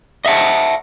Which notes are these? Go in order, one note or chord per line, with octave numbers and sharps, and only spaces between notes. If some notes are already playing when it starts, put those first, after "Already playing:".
D#5 E5 F#5 A5